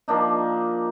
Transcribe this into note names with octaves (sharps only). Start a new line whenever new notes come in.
F3 A#3 D4 D#4